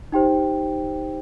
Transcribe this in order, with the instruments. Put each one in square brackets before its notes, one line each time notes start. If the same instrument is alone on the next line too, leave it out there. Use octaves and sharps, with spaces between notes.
[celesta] D#4 G4 C5 G5